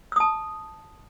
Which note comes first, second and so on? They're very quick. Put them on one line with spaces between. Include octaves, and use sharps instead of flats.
E6 D#6 A5